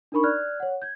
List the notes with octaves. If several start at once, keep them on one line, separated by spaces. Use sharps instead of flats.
D4 D#4 A#4 B5 C#6
D5 F6 F#6 G#6
C#5 F#5
G6 G#6